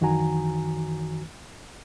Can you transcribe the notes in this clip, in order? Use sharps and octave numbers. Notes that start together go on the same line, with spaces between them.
F#2 D#3 E3 F#4 G#5 A#5